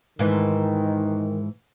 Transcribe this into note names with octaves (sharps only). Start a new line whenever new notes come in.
G#2 D#3 E3